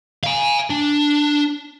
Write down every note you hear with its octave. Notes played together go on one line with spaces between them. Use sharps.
F5 G#5
D4